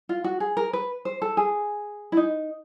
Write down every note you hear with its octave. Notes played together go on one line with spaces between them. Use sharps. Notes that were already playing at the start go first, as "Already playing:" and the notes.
F4
F#4
G#4
A#4
B4
C5
A4
G#4
E4
D#4